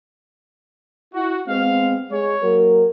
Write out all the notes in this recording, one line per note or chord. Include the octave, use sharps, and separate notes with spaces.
E4 F#4
G#3 B3 C4 F5
G#3 C#5
F#3 A#3 A#4